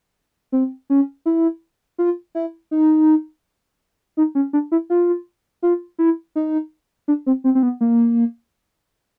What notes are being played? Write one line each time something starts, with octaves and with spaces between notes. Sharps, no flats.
C4
C#4
E4
F4
E4
D#4
D#4
C#4
D4
E4
F4
F4
E4
D#4
D4
C4
C4
C4
B3
A#3